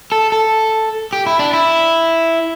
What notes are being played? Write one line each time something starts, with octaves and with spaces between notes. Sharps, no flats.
A4
A4
G4
E4
D4
E4